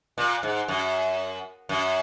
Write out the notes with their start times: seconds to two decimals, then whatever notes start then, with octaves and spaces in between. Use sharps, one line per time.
0.18 A#2
0.43 G#2
0.68 F#2
1.69 F#2